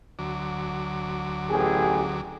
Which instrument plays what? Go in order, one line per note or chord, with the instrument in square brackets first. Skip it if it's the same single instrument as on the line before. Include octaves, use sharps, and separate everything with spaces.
[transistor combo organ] D2 F#3 D6
[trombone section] A1 G4 G#4